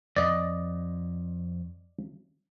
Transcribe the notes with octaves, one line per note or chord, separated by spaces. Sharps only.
F2 D5 D#5